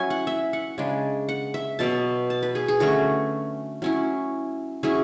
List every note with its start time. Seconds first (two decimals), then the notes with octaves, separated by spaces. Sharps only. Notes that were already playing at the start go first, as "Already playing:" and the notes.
Already playing: F#3 C#4 E4 E5 G#5
0.10 F#5
0.27 E5
0.53 F#5
0.78 C#3 G#3 D4
1.29 F#5
1.54 E5
1.79 B2 F#3 B3 A5
2.30 A5
2.43 B4
2.55 G#4
2.68 G#4
2.80 D3 F#3 A3 C#4 F#4
3.82 F#3 C#4 E4
4.83 F#3 C#4 E4 G#4